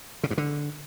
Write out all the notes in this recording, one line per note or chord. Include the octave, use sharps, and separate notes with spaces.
C#3
G2
D3